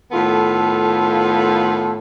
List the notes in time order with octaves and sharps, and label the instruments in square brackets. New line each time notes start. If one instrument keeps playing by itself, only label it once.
[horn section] A2 D#3 B3 F4 A4